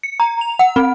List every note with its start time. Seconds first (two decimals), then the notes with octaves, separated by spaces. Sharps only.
0.03 C#7
0.20 A#5
0.41 F7
0.59 F#5
0.76 C4